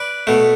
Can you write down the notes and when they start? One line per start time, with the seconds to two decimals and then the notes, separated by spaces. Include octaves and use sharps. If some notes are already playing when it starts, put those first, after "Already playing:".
Already playing: B4 D5
0.27 B2 A3